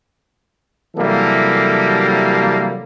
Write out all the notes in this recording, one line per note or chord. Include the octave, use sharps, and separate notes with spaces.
C3 E3 F#3 G3 A#3 A4